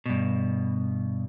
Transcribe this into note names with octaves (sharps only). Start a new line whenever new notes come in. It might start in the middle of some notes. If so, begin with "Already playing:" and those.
G2 B2